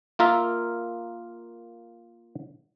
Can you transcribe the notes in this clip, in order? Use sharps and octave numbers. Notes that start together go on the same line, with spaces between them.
A#3 F4 A#4 E5